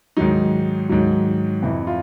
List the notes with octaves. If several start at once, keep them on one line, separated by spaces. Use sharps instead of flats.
G#2 D#3 F#3 D#4
G#2 D#3 F#3
F2 C3 E3
F4